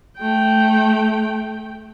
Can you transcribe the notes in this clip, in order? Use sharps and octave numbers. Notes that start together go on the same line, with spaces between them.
A3 G5